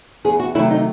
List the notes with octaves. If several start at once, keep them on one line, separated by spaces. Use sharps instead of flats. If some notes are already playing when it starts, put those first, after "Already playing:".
E2 G#4
F#4
C3 D#3 F#3 A3 E4
D#4